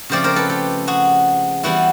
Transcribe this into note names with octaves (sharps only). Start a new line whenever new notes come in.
C#3 F3 A3 C4 C5 D5
A#4 C5
A4 B4
G4 A4
F#4 G#4
E3 G3 B3 E4 F#4